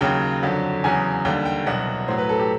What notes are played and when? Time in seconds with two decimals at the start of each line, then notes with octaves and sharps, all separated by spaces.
0.01 D#2 C#3 F#3 G5
0.43 F2 D3 F#3
0.84 E2 C#3 F#3 G#5
1.25 D#2 D3 G3 G5
1.45 G5
1.66 C2 B2 F#3 F#5
2.08 A2 F#3 C5
2.18 B4
2.29 A4
2.39 G4